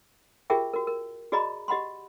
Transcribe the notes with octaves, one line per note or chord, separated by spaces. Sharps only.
F4 G4 G#4 A#4 E5 G5
F#4 A#4
A#4
F#4 G#4 D5 D#5 A#5 B5
G4 D#5 F#5 B5 C6